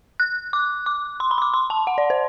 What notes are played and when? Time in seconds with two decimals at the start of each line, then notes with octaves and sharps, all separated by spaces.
0.20 F#6
0.53 D6
0.86 D6
1.20 C6
1.31 B5
1.38 C6
1.42 D6
1.54 C6
1.70 A5
1.87 F#5
1.98 D5
2.10 C5